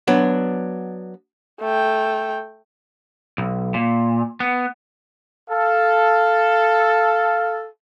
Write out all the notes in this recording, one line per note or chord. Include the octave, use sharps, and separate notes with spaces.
F#3 B3 D4
A3 G5
B1
A#2
B3
A4 F5